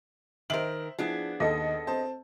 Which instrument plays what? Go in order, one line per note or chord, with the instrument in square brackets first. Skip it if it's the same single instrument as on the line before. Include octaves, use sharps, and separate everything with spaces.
[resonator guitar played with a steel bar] D#3 A#4 [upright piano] C5 E5 [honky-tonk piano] F#7
[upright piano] F3 E4 [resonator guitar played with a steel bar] B3 D4 G#4
[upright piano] D#2 [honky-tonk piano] A4 D#5
[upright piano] C4 C5 A5